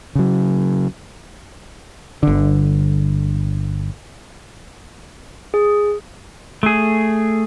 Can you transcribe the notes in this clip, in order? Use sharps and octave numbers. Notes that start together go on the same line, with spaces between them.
C#3 F#3
G1 D3
G#4
A3 G#4